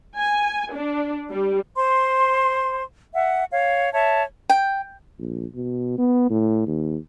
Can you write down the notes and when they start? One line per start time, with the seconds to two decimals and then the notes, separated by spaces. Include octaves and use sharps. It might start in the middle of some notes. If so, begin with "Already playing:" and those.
0.17 G#5
0.73 D4
1.31 G3
1.75 C5 C6
3.14 E5 F#5
3.52 C#5 F5
3.93 C#5 E5 A5
4.50 G5
5.19 A#1
5.55 B2
5.98 B3
6.30 A2
6.67 D#2